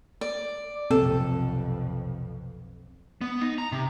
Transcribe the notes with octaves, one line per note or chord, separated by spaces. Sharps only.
D5
B1 F2 C3 C4 A4
B3
D#4
A#5
C3